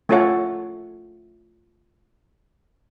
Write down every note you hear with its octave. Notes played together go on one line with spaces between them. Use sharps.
A3 C#4 F4 A4 C#5 F#5